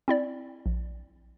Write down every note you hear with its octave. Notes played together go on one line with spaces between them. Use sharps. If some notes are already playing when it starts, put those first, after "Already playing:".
C4 E4 D5
A#1